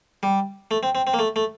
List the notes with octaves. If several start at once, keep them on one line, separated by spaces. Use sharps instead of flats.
G3
A3
C4
C4
C4
A#3
A3
A3